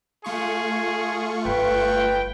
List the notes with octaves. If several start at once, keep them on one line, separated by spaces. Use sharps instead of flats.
A3 F4 G#4 C#6
G1 B4 G5